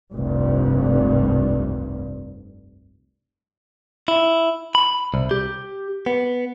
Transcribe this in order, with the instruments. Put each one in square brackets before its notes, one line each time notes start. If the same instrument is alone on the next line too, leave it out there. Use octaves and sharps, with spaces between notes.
[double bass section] F1 C2 G2
[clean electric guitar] E4
B5
C2
G4
B3